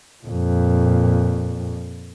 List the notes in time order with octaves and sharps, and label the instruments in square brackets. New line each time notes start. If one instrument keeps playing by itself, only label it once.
[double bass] F2 A#2